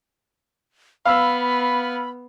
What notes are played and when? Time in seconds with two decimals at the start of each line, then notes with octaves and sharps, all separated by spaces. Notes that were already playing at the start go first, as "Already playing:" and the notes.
1.05 B3 F5 B5 E6